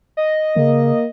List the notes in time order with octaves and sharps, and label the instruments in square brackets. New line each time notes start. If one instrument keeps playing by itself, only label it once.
[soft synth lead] D#5
[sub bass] C#3 [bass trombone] A#3